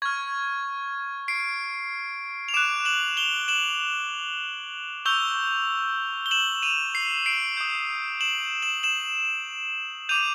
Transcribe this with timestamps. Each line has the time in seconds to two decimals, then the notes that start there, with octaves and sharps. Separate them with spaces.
0.02 C#6 F6 G#6
1.28 C7 D7
2.49 F7
2.54 D6 F#6 D7 E7
2.85 E7 F#7
3.17 F7 G7
3.48 E7 F#7
5.05 C#6 E6 G6 F7 G7
6.26 G7
6.31 E7 F#7
6.62 D#7 F7
6.95 C7
7.26 C7 D7
7.57 D#6 G6
8.21 E7 F#7
8.62 E7 F#7
8.83 E7 F#7
10.09 D6 G6 D#7 F7